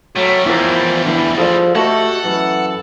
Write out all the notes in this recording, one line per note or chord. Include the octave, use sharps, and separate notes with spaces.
A2 F#3 G3 A3
E2 F3 E4 A#4
D3 E3 E4
F3 G#4 A4 D5
A3 F#4 G4 A4 D#5 F#5
F#2 E3